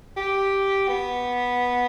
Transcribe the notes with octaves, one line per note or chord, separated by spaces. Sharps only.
G4
B3